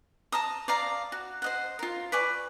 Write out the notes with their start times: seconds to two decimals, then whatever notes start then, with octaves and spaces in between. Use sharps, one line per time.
0.32 A5 A#5 D#6
0.68 D5 F5 A#5
1.12 F#4
1.42 C5 D#5 F#5
1.79 F4 A#4
2.12 B4 D5 G#5 C#6